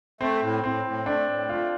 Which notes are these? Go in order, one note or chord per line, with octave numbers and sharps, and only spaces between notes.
A3 C4
A2
A2 C4
A2
A3 D4
A2
A3 F4